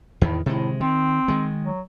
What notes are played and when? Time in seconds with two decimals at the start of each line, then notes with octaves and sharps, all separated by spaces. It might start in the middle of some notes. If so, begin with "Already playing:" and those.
0.21 E2 A2 D#3
0.46 A2 C3 D#3 G#3
0.80 D#3 C4
1.28 D#3 G#3
1.64 F#3